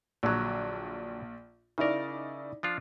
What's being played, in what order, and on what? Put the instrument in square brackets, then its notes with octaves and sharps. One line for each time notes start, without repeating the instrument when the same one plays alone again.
[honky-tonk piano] A#1 [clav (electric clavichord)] D3 F#3
[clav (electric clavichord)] C#3 A#4 [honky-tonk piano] D#4 E4 D5
[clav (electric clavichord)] F3 D4 F4